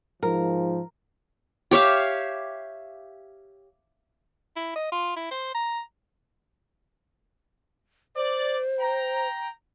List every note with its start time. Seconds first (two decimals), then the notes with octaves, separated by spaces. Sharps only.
0.23 G#2 F3 A#4
1.71 G4 C#5 E5 F5
4.56 E4
4.76 D#5
4.92 F4
5.16 E4
5.31 C5
5.55 A#5
8.16 C5 D5
8.78 G5 A#5